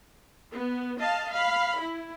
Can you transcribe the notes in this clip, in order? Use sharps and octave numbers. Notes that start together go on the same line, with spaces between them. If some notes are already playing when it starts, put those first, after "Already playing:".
B3
D#5 F5 A5
F5 B5
E4